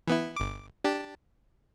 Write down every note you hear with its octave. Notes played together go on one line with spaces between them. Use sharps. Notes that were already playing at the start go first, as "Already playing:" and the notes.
E3 B3 E4
G1 D6
D4 G4 A5